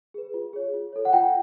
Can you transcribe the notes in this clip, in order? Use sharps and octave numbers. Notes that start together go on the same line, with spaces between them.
G#4 B4
F4
G#4 C#5
F4
A4 C#5
F#5
F4 G5